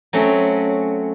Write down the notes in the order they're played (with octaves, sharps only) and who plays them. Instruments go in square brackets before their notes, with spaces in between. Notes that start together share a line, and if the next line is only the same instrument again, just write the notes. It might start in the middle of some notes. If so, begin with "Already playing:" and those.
[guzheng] F#3 A3 C4 C#4